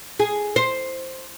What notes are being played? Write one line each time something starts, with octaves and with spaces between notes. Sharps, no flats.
G#4
C5